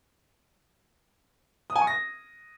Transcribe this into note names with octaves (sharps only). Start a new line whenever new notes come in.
D#6
G#5
C#6
A#6